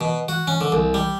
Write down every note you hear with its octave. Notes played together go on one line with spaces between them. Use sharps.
B2
F#4
C#4
D3
C2
G3